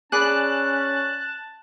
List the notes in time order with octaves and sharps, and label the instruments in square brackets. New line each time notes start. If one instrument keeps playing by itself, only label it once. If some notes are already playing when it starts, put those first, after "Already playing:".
[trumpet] C#4 [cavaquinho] G#4 D5 B5 [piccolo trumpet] A5 [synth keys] F#6